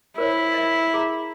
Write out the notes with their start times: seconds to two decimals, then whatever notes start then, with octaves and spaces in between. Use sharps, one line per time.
0.18 E4 A#4 C5 C#5
0.54 D#5 E5
0.94 G#4 A#5